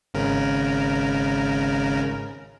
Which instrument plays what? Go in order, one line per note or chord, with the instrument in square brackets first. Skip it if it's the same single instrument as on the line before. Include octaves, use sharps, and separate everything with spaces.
[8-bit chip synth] G#1 C#3 A#4